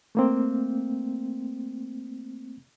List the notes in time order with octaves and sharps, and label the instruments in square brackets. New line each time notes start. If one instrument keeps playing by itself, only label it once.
[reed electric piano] A3 A#3 C4